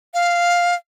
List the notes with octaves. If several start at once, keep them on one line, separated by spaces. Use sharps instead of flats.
F5